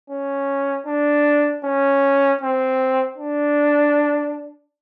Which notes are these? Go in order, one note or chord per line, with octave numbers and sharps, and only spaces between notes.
C#4
D4
C#4
C4
D4